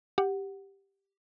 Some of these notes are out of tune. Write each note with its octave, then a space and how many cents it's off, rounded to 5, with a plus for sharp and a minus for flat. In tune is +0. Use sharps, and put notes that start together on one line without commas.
G4 +0 F#5 +0